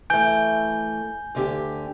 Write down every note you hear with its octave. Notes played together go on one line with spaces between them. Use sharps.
E3 A3 G#5 G6 G7
D2 D3 G4